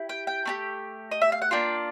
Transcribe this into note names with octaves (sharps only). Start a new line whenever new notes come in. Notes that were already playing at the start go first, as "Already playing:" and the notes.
Already playing: E4 G4
G5
G5
A3 D4 G4
D#5
E5
F5
F#5
A#3 D4 F4 G5